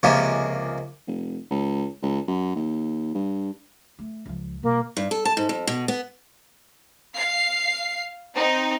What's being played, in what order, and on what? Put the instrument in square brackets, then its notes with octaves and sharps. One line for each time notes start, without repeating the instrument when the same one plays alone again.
[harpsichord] C#2 C3 F3 G#3 A#3
[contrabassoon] F1
C#2
C#2
F#2
D#2
G2
[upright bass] A3
C#2 F3
[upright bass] B2 G3 [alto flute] A#3
[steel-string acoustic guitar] G2
A4
A5
G#2
F2
B2
B3
[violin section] F5 C7
C4 D#4